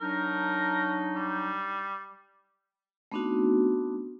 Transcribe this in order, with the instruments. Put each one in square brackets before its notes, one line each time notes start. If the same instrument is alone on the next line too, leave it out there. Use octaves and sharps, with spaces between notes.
[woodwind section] F#3 D4 D#4 [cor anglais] A#4
[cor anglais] G3
[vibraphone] A3 B3 C4 D4 D#4 F#4